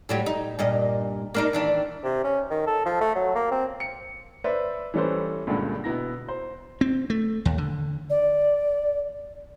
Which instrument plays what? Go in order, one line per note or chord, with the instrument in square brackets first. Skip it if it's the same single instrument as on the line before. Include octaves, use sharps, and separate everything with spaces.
[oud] A2 F#3 G3
D#4
G2 A#2 D#5
A#3 D4 D#4
D#3 E3 D4
[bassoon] C3
C#4
D#3
A4
F3
A3
F#3
A#3
C4
[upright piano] C#7
B4 C5 D5 E5
E3 G3 C#4 A4 B4 C5
C#2 G2 A#2 D3
B2 B3 E4 A#6
C5
[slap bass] C4
A3
D#2
D3
[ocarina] D5